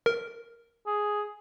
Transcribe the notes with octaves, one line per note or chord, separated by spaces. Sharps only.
A#4
G#4